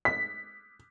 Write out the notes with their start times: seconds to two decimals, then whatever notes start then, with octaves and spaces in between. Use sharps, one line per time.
0.05 B6